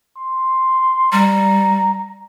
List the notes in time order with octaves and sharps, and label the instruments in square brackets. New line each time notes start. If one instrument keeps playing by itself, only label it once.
[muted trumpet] C6
[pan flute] G3 [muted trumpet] A#5